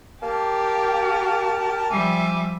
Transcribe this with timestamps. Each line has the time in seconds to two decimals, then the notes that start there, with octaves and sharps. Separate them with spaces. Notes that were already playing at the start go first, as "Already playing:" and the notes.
0.22 A#3 G4 A#4 A5
1.90 F3 G3 E5 G#5 D6